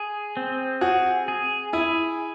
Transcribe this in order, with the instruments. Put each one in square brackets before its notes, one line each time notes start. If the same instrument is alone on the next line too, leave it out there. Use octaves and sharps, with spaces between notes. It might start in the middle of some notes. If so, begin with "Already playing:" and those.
Already playing: [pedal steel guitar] G#4
C4
[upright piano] F#4 [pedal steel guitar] G#4
[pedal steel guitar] G#4
[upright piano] E4 [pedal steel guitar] G#4